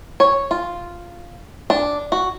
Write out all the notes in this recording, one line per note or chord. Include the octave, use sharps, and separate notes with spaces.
C#5
F4
D4
F#4